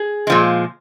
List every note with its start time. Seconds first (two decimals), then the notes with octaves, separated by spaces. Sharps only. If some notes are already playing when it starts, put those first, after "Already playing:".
Already playing: G#4
0.27 A#2 F3 G#3